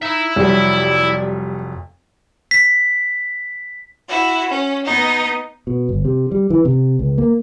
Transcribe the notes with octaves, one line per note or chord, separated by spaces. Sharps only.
D#4 E4 E5
F1 F#3 G3 D5
B6
E4 F#4
C#4
B3 D#4
B2
G1
C3
G3
E3
C3
C#2
A#3